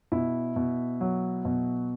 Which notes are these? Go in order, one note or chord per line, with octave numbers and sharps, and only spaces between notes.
B2 E4
B2
F#3
B2